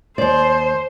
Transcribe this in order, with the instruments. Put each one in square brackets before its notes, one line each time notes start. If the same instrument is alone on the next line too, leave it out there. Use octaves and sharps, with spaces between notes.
[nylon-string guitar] D#2 D5 [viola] C5